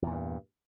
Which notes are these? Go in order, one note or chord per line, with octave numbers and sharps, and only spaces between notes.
E2 G2 A#2